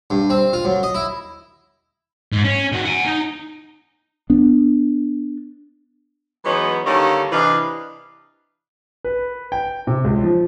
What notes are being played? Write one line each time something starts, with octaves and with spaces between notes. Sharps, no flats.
G2
C4
F4
F#2
D#5
E4
G#2
C#4
D#3 F#4
F#5 G#5
D#4
B3 D4
E3 F#3 G#3 B3 C#4 D#4
D3 D#3 G3 A#3 C#4 A4
C3 E3 D4 B4 D#5 F5
B4
G5
C3
C#2
F3